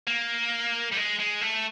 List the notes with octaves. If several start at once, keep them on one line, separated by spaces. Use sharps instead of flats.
A#3
G3
G#3
G#3
A3